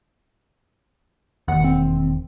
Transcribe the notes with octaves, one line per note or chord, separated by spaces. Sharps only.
E1 D#2 F#5
C4